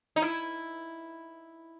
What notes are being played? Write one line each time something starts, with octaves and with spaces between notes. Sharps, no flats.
D#4
E4